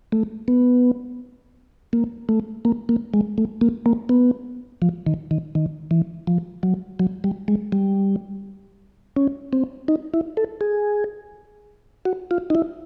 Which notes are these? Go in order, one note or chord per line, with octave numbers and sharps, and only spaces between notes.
A3
B3
A#3
A3
A#3
A#3
G#3
A3
A#3
A#3
B3
F3
D#3
D#3
D#3
E3
F3
F#3
F#3
G3
G#3
G3
C#4
C4
D#4
E4
A4
G#4
F#4
F4
D#4
E4